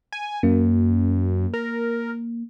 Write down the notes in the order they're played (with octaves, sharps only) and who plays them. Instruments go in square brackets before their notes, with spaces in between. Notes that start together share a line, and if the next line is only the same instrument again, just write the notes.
[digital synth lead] G#5
[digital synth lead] F#2 [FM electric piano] A#3
[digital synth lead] A#4